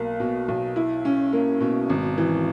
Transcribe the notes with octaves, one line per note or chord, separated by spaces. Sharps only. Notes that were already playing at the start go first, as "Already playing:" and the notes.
Already playing: B1 A#3
B2
B1
E4
C#4
A#3
B2
G#1
E3